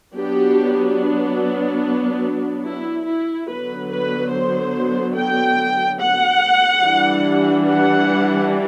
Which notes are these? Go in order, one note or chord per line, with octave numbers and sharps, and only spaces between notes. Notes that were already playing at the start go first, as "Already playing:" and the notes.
F#3 B3 D4 G4
E4
E4
D3 F#3 B3 B4
B4
C5
G5
F#5
E3 G3 D4
F#5